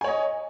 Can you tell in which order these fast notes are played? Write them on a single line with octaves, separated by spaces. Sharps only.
G#5 C#5 D#5